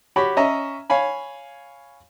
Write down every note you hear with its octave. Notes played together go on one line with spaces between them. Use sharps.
F#4 G4 C#5 B5
C#4 D#5 E5 A#5
C#5 F5 G#5 B5